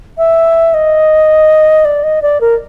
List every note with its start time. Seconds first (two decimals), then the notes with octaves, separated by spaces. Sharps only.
0.18 E5
0.74 D#5
1.85 D5
2.03 D#5
2.22 D5
2.41 A#4